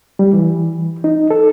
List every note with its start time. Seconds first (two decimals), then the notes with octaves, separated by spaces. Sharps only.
0.19 G3
0.33 E3
1.04 D#4
1.30 A4